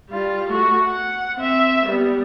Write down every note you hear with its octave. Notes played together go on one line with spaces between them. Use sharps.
G3 F4
A3 F#4
F#5
C4 E5
G3 B3